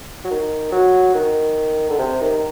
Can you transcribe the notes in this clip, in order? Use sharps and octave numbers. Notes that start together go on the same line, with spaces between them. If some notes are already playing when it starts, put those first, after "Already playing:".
F#3
D#3
F#3
D#3
D3
C3
D#3